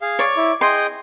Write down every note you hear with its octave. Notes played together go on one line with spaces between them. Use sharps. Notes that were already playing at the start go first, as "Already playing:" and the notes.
G#4 F5
C#5 D5
E4
G#4 D#5 G5 C6